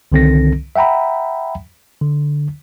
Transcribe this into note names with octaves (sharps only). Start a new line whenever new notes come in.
C2 D3 D#3 C4 A4 A#6
E5 F#5 G5 A#5 B5
D3